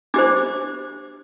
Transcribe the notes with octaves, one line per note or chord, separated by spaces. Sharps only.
D4 G4 C5 D6